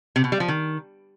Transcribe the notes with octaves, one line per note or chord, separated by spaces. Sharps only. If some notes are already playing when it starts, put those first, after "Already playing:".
C3
B2
G3
F3
D#3